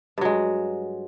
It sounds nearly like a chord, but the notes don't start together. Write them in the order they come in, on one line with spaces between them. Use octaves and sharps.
G2 F#3 G#3